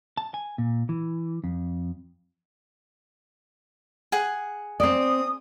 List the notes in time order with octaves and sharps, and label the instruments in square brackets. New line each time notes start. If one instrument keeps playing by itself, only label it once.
[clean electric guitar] A5
G#5
A#2
E3
F2
[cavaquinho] G#4 F#5
[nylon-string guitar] C4 D5 [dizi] D#6